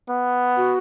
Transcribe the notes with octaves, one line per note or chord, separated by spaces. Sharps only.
B3
F#4